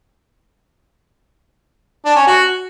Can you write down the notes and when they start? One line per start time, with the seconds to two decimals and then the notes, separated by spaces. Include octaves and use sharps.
2.05 D4
2.16 C#4
2.27 F#4